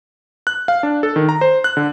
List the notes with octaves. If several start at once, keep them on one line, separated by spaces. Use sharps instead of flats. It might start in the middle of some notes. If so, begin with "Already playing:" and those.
F#6
F5
D4
A4
D#3
A#5
C5
F#6
D3